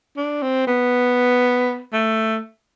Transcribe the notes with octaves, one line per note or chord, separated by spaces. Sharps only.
D4
C4
B3
A3